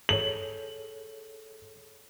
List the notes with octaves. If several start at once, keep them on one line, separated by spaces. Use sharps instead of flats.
G#4 A4 C#5 F#7